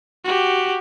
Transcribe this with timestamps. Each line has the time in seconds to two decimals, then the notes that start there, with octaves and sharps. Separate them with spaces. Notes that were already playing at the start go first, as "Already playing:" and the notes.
0.25 F#4 G4